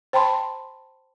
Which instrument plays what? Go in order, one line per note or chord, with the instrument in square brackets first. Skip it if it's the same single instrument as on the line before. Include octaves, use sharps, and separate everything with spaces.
[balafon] C5 G5 A5 B5 C6